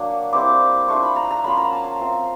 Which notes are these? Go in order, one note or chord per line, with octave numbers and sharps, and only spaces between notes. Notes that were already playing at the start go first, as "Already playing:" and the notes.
Already playing: F#3 A#3 D4
G3 C4 E4 D6
A3 D4 F4 C#6
B5
A#5
A#5
F#3 A#3 C#4 F4 B5
A#5
A5
A#5
A3 C4 F4